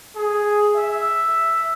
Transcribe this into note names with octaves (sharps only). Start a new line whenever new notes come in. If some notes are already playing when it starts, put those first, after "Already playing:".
G#4
E5